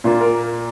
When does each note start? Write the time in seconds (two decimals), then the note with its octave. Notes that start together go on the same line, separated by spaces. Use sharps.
0.04 A#2 A#3 F4
0.21 A#4